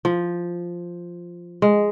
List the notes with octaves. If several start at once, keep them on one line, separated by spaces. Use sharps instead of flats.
F3
G#3